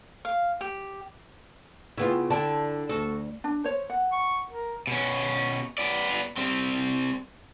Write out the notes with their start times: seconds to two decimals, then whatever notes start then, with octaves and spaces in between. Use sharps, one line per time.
0.25 F5
0.61 G4
1.97 C#3 B3 E4 F4
2.30 D3 E4 G5 A5
2.89 D2 F#4 A4
3.44 D4
3.64 C5 C#5
3.90 F#5
4.12 C#6
4.50 A#4
4.87 B2 C#4
5.78 B3 D5
6.37 G3 C4